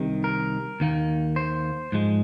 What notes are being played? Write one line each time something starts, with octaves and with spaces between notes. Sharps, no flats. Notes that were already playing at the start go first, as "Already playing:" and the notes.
Already playing: C2 C3 D#3
A#4
D#2 D#3 A#3
C5
G#2 F3 G#3